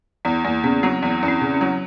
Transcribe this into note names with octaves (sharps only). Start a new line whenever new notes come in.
E2 B3
E2 A#3
C#3 B3
F#3 C4
E2 B3
E2 C#4
C4
C#3
C#4
F#3